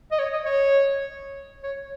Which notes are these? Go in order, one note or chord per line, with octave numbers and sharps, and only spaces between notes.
D#5
C#5
D#5
C#5
C#5